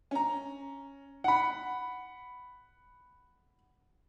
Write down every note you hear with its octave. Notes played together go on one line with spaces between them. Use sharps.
C#4 A#5
F#5 B5